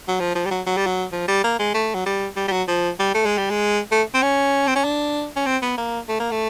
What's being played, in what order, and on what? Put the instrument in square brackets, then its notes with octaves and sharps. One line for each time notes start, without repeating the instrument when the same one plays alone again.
[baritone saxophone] F#3
F3
F3
G3
F#3
F#3
G3
F#3
F3
G3
A#3
G#3
A3
F#3
G3
G3
G3
F#3
F3
G3
A3
G#3
G3
G#3
A3
C4
C#4
C4
C#4
D4
C#4
C4
B3
A#3
A3
A#3
A3